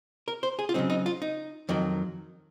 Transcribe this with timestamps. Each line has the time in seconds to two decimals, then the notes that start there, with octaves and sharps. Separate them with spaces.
0.28 A#4
0.43 C5
0.59 G#4
0.69 F4
0.74 C#3 F#3 C4 D#4
0.90 D#4
1.06 F4
1.22 D#4
1.69 F2 D#3 F#3